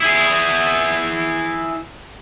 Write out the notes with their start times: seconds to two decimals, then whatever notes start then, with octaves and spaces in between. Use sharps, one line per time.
0.01 E4 G#4